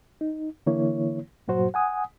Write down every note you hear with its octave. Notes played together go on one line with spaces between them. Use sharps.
D#4
D3 E3 A#3 E4 C#5
G2 A#2 F#3 F#4 C5
F#5 G#5 D#6